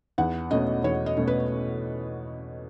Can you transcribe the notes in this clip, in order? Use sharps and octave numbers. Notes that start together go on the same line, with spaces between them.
E2 F#5
B2 A3 C#4 D#5
E2 C#5
D#5
B2 A3 C#4
B4